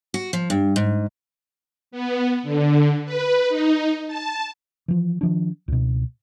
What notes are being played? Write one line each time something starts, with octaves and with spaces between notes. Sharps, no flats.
F#4
F3
G2
G#2
B3
D3
B4
D#4
A5
E3 F3
D#3 F3 D4
C#2 B2